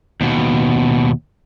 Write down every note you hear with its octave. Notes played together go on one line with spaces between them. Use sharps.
D#2 B2